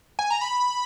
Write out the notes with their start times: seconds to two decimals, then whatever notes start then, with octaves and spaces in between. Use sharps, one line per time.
0.19 G#5
0.31 A#5
0.41 B5